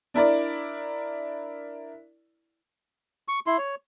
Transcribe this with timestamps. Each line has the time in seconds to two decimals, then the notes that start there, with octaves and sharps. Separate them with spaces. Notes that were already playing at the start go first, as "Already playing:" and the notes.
0.14 D4 E4 A#4 D5
3.28 C#6
3.47 E4 C6
3.58 C#5